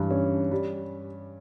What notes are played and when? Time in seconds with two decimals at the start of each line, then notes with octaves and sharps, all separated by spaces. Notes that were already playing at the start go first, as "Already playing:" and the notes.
Already playing: G2 E3
0.11 C#4
0.51 G3